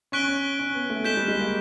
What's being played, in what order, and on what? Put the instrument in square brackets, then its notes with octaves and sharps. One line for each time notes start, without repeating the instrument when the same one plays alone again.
[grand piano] C#4 [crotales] C#6 F#6 B6 D7 G7
[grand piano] C#4
C#4
B3
A3
[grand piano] G#3 [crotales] G6 B6 E7 G7
[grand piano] G3
G#3
A#3